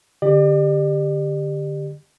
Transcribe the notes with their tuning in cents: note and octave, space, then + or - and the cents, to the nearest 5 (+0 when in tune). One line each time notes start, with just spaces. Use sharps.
D3 +5 G4 +10 D5 +40